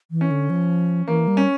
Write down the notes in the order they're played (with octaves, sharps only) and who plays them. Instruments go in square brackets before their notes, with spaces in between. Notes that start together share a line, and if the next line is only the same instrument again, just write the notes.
[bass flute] E3
[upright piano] C#4
[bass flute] D3
F3
[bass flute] E3 [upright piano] A#3
[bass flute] G3
[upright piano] C#4